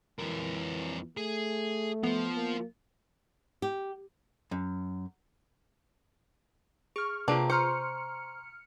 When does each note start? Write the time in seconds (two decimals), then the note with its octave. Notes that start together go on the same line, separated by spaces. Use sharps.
0.20 F2 E3 A#4
1.17 A3 G#4
2.03 F3 B3
2.36 A#3
3.62 G4
4.51 F#2
6.96 G#4 C#6 F6
7.28 C3 A#3 D4 F4 G4 G#4 B4
7.50 C5 A#5 C6 C#6 F6 C#7